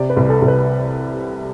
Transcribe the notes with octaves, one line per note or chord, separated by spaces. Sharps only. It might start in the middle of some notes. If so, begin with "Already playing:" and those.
Already playing: C3 D5
B4
C2
A4
C2
B4